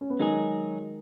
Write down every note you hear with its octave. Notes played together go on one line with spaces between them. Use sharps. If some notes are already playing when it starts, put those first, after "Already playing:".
C#4
B3
D#3 F#3 G#3 D#4 G#4